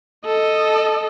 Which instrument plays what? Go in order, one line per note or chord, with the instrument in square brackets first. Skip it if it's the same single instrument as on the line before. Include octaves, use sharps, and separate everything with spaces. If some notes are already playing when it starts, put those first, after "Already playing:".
[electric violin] A4 D#5